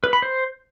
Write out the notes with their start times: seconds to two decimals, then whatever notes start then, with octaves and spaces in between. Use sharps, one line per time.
0.04 B4
0.13 B5
0.22 C5